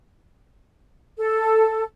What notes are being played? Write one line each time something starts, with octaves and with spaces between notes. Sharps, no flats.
A4